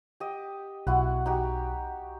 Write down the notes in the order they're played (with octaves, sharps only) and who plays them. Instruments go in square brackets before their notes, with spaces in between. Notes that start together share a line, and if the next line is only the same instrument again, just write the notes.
[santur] G4 D#5
[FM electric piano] B1 [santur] E4 F#4 F#5
[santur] D#4 F#4 G4